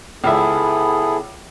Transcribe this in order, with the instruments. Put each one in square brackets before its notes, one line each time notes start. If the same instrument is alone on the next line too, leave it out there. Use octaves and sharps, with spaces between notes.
[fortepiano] C#2 E5 [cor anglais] B3 [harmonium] E4 G#4 A4